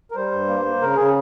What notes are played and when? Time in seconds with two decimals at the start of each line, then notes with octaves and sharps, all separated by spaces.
0.11 A#4
0.15 G3 C5
0.32 G2
0.48 A#3
0.65 A#3
0.81 C#3 A#4
0.96 C#3 G#4